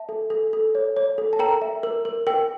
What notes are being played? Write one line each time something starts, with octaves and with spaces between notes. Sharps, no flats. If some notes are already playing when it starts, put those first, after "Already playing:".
Already playing: E5 A5
A4
A4
A4
C#5
C#5
A4
A5
A#4 G5 A#5
E5
A#4
A#4
A#4 G5